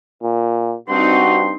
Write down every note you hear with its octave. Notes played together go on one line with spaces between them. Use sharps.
A#2
G2 C4 D#4 F#4 C6